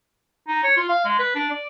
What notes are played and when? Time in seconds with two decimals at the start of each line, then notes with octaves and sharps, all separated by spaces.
0.48 D#4
0.64 C#5
0.77 F4
0.89 F5
1.05 G#3
1.19 B4
1.35 D4
1.50 D5